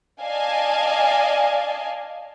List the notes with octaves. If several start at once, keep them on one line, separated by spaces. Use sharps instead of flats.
D5 D#5 F5 G#5 A5